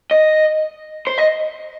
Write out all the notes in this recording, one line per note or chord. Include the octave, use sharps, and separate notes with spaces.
D#5
C5
D#5